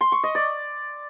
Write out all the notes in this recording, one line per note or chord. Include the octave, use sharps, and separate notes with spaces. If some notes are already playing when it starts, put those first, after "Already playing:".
C6
C#6
D#5
D5